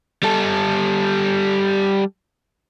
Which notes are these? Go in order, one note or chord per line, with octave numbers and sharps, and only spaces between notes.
G3 A4